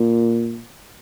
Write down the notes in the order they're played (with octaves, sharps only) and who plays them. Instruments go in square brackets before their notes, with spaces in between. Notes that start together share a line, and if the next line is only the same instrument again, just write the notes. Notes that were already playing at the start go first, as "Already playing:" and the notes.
Already playing: [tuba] A#2